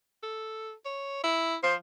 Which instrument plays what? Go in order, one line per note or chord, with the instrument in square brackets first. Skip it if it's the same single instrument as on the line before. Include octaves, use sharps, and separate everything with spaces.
[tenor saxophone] A4
C#5
E4
[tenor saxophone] F3 [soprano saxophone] C5